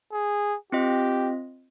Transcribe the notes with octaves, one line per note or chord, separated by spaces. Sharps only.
G#4
C4 F4 G4 D#5